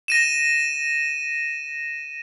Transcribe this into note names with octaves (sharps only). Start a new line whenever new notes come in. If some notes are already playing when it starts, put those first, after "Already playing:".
A#6 D#7 E7